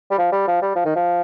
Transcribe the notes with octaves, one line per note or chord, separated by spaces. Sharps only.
G3
F3
G3
F3
G3
F3
D#3
F3